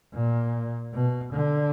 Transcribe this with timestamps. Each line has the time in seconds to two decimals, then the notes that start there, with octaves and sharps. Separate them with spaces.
0.14 A#2
0.94 B2
1.33 D3